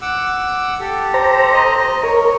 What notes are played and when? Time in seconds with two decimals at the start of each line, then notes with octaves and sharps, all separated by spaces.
0.02 F#5 D6 E6
0.80 G4 A4
1.14 C5 A#5
1.53 D#5
2.03 A#4 C#5